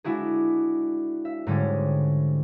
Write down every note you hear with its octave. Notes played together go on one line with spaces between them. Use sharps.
G#3 D4 E4 F#4 G#4
E5
G#2 D3 G3 G#3 C#4